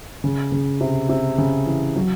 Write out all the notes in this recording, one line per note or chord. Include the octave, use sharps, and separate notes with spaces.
C#3
C#3
C3
C3
C#3
E3
F#3